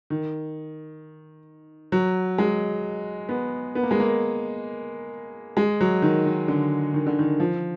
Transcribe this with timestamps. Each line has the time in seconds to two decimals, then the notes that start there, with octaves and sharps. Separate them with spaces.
0.10 D#3
1.92 F#3
2.38 G#3
3.29 B3
3.75 B3
3.83 A#3
3.91 G#3
4.00 A#3
5.57 G#3
5.81 F#3
6.02 D#3
6.26 D#3
6.48 D3
6.94 D#3
7.07 D3
7.19 D#3
7.40 F3